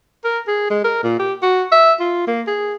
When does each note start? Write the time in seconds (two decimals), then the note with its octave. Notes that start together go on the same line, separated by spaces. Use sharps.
0.24 A#4
0.48 G#4
0.70 G#3
0.84 A#4
1.04 A#2
1.19 G4
1.42 F#4
1.72 E5
2.00 F4
2.27 A#3
2.47 G#4